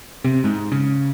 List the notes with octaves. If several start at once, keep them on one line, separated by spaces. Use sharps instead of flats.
C3
G#2
C#3